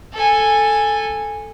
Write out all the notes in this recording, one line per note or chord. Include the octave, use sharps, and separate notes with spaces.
A4 G#5